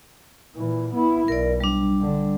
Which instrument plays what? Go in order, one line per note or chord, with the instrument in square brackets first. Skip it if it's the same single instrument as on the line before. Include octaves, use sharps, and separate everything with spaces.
[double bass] A#2 E3
B3 E4
[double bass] B1 [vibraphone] A#4 D5
[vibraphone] G3 D4
[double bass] D3